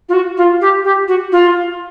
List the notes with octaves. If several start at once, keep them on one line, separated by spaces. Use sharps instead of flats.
F4
F#4
F4
G4
G4
F#4
F4